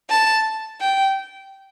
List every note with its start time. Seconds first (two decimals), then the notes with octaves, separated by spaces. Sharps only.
0.10 A5
0.80 G5